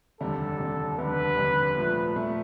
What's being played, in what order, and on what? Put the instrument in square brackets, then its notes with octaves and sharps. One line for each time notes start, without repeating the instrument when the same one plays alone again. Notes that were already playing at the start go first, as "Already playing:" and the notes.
[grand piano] F1 D#2 D3 G3 [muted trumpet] A4
[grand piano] F1 D#2 D3 G3
[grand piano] F1 D#2 D3 G3 [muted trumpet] B4
[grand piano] F1 D#2 D3 G3
A#2 F3 A3
A#2 F3 A3